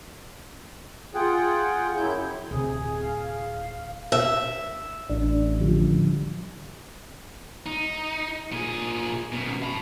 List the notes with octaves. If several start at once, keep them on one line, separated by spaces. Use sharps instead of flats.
F4 G#4 F#5 G5
F#2 F#3 E4 G6
D1 C3 E4 G#4
F5
E5
A1 D4
D3 F3 G3
D#4
A#2 G#4
F#2 B2
A5 B5